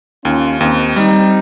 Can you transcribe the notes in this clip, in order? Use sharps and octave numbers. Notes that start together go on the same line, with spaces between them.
D#2 C#4 F4
D#2 C4 D#4
G3 C4 D#4